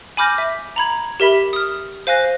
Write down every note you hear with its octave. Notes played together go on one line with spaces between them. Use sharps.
G#5 B5 D6 F6 G6 A#6
E5
A#5 B5 G#6
G4 A#4 E5 B5
D#6 F6
C5 F5 G#5 F#6 A#6